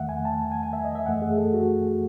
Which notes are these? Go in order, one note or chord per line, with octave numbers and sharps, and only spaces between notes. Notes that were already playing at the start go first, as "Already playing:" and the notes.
Already playing: E2 D#3 A3 E5 F#5
G#5
A5
G#5
G#5
E5
D#5
E5
F#2 E3 A3 F#5
G#4
A4
F#4